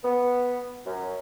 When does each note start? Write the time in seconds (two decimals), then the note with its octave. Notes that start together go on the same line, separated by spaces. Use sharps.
0.03 B3
0.86 F#2